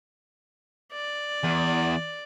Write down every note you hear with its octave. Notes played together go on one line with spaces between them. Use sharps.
D5
E2